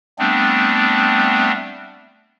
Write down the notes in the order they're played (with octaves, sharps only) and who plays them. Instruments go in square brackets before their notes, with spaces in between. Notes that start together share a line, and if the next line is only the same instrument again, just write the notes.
[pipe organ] G3 A3 B3 C4 D4